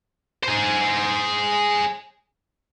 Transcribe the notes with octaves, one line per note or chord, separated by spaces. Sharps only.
G#4 C5